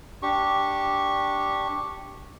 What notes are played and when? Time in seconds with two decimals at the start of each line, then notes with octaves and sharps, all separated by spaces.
0.23 D4 G4 C#6